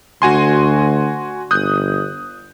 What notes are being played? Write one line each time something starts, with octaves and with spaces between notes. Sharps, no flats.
D2 F#4 G#5 C6
G1 D#6 F#6 G6